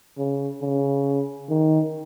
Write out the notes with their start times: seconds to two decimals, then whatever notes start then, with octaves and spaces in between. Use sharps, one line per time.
0.18 C#3
0.62 C#3
1.49 D#3